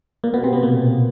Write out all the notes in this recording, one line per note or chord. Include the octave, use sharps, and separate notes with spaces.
A#2 A#3
B2 B3
C3 C4
B2 B3
A#2 A#3